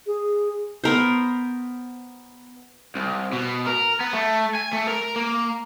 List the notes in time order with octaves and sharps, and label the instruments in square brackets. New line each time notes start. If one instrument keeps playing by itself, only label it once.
[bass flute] G#4
[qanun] B3 A#4 C5
[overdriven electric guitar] C2
B2
A#4
B3
A3
G#5
A3
A#4
A#3